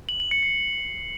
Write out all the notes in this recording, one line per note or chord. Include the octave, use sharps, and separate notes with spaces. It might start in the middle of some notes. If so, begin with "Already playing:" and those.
F#7
F#7
C#7
C7